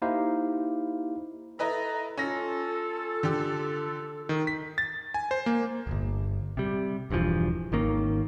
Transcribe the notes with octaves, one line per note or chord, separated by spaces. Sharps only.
A#3 D#4 E4 G4 C5 F5
E4 A4 B4 D#5 A#5
C#4 F4 A4 A#6
D3 G4
D#3
B6
A6
G#5
C5
A#3
D1 G1
C3 G3
E1 G2 E3 F3
G#1 D#3 A#3 C#4